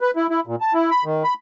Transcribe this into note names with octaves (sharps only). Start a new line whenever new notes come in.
B4
E4
E4
A#2
A5
E4
B5
D#3
B5